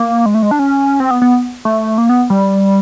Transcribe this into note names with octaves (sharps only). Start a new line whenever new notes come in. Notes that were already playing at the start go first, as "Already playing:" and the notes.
Already playing: A#3
G#3
A3
G#3
D4
C#4
C4
B3
B3
A3
A#3
B3
G3